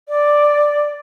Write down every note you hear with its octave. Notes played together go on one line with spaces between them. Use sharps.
D5